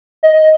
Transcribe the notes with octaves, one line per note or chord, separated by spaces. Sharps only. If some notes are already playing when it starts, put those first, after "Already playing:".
D#5